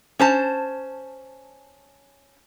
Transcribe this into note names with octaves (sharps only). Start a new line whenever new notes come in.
C#4 C5 A5